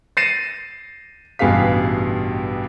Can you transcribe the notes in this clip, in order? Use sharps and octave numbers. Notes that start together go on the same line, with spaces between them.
A6 A#6 C7 C#7 D#7 E7
A1 G2 B2 G#4 F5 B6